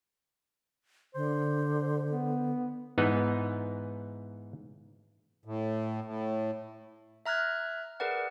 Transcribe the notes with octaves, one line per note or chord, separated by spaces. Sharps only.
D3 C5
B3
G#2 E3 B3 D#4
A2
A2
E5 A#5 F6 F#6 G#6
G#4 A#4 B4 D5 F#5